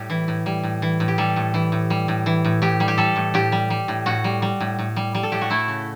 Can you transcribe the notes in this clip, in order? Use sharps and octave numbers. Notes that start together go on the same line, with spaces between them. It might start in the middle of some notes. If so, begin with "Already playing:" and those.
Already playing: A2 G3 G4
E3
A2
G3
A2
E3
A2
G4
G3 A4
A2
E3
A2
G3
A2
E3
A2
A2 G4
G3
G4
G3 A4
A2
A2 G4
G3
G3
A2
A2 F#4
G3
G3
A2
A2
G3
G3
A4
A2 G4
F#4
A3 E4
C#3